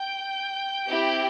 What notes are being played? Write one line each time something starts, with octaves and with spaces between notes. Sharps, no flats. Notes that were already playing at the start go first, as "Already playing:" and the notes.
Already playing: G5 G6
C4 E4 G4